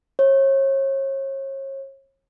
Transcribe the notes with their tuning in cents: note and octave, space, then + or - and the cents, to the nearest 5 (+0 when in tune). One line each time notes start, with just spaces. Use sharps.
C#5 -35